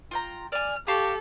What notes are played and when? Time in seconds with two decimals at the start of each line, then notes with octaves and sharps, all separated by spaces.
0.11 F4 G5 A#5
0.52 D5 G#5 F6
0.88 G4 A4 F5 A5 C#6